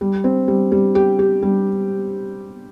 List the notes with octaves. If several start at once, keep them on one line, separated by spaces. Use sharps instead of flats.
G3
C4
G3
G3
G4
G4
G3